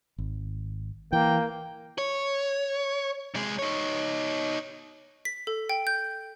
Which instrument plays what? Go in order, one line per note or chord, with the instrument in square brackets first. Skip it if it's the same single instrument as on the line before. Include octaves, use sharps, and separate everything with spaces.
[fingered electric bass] G#1
[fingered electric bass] E3 [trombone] A#3 [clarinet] G5
[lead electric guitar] C#5
C3 G#3
D#4 C#5
[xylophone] B6
A4
G5
G6